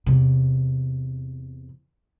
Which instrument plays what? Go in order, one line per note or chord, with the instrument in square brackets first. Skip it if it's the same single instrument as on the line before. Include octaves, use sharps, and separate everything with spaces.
[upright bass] E2 C3